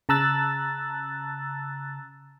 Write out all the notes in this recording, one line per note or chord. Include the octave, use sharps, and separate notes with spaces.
C#3 A5 A#5 E6 F#6 A6